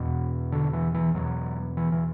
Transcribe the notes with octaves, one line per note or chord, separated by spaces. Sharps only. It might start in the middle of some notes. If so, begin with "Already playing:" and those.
Already playing: E2 B2
D3
E3
E3
E2 B2 F#3
E3
E3